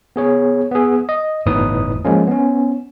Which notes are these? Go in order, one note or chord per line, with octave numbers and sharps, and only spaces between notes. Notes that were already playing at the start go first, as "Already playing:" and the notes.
B3 G#4 C#5
B3 G#4
D#5
G1 E2 A2 D#4 B4 D#6
F3 G#3 A#3 C#4
B3 C#4